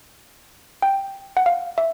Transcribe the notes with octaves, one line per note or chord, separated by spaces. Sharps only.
G5
F#5
F5
E5